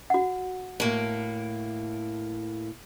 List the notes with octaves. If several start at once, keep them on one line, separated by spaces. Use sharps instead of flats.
F#4 F#5
A2 A#3